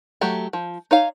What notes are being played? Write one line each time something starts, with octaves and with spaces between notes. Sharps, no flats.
F#3 A3 G4
F3
D#4 C#5 F5